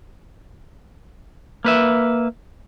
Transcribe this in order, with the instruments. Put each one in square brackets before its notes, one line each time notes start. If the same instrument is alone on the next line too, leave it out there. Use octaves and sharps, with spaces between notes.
[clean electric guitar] A#3 B4 E5